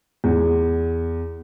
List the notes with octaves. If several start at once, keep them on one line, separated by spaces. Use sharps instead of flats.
E2